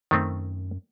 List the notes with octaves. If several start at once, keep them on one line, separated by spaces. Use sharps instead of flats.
F#2 D#3 A3 C4